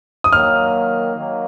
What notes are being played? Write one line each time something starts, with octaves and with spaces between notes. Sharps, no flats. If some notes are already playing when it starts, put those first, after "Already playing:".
D#6
D#3 F#3 A#3 F6
D#3 F#3 A#3